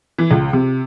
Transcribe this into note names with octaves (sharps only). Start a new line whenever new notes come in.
E3
C#2
C3